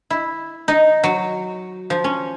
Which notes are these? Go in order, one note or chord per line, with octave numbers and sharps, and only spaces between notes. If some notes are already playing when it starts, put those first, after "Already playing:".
E4
D#4
F#3
F3
C#4